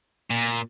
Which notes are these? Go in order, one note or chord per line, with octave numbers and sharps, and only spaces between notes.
A#2